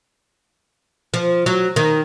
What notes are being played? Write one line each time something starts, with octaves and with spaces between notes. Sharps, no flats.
F3
F#3
D#3